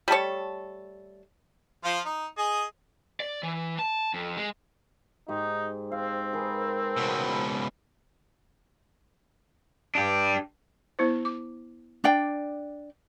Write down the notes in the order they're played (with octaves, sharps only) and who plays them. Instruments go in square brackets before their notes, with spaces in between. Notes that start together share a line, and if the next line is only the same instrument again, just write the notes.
[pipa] G3 A3 A4 C#5
[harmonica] F3 F4
D#4
G#4 D#5
[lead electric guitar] D5
E3
A5
F2
G#3
[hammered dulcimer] G#2 G4 [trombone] D#4
[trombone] C4 [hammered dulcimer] F5
[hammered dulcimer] G#4 A#4 B4
[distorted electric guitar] C#2 B2
[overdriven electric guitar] D4 G4
[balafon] B3 E4 C5
D6
[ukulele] D4 D5 G5